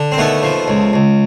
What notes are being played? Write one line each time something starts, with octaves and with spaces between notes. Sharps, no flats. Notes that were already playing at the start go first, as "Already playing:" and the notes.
Already playing: D3
C4
D#2 A3 B3
F3
C#2
C#2